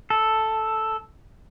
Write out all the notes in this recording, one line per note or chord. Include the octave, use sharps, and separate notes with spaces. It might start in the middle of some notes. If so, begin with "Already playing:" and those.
A4